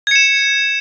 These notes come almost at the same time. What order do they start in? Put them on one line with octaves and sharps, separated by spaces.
G#6 C#7 E7